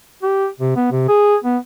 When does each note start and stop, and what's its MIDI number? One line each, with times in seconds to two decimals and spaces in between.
0.23 0.47 67
0.60 0.74 48
0.76 0.90 59
0.91 1.03 48
1.09 1.36 68
1.44 1.57 59